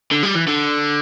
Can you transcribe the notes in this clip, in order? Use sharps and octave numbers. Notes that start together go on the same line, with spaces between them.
D3
G3
E3
D3